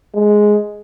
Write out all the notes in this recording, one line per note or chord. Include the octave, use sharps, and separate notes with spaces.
G#3